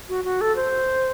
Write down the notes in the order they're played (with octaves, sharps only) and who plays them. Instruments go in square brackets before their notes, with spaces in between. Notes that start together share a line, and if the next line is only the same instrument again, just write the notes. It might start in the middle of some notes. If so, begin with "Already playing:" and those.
[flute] F#4
F#4
A4
C5